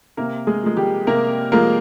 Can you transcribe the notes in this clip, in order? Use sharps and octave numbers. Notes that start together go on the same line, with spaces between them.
C3 A#3 A#4
G#3 G#4
F3 G#3
G3 G4
C3 A#3 A#4
F3 G#3 A#3 A#4